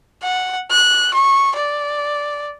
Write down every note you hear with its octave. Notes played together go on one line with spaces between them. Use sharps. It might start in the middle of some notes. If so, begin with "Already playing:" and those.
F#5
F#6
C#6
D5